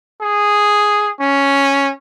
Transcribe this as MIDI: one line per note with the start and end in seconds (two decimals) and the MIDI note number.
0.22 1.11 68
1.20 1.92 61